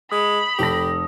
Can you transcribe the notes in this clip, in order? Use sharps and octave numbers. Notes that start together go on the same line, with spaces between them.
G#3 B5 D#6
F1 G4 A4 A#6